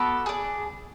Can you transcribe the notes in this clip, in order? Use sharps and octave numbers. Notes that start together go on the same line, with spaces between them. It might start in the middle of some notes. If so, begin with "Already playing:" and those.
Already playing: B3 F#4 A4 B5 D6
D4 G#4